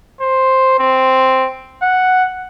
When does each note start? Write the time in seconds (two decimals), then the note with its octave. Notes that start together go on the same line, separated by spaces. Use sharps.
0.21 C5
0.79 C4
1.82 F#5